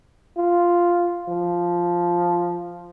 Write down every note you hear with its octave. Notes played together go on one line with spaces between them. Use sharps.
F4
F3